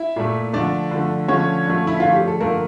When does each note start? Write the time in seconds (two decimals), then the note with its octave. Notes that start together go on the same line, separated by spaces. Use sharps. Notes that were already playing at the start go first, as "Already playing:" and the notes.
Already playing: E4 E5
0.16 A#2 A3
0.53 D3 F3 A3 D4 D5
0.91 D3 F3 A3
1.28 D3 F3 A3 C#4 C#5
1.66 D3 F3 A3
1.87 E4
2.00 D3 F3 A3 F4
2.13 G4
2.27 A4
2.40 D3 F3 A3 A#3 A#4